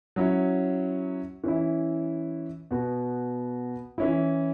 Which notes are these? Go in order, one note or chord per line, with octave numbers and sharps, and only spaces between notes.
F#3 C#4 E4
E3 C#4 E4
B2 B3 F#4
E3 C#4 E4